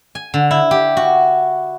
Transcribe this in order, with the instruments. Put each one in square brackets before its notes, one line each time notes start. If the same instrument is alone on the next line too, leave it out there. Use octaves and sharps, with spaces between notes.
[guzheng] G#5
D3
E4
G4
F#4